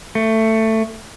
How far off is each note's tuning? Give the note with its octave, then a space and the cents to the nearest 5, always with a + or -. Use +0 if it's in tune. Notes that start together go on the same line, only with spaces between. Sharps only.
A3 +15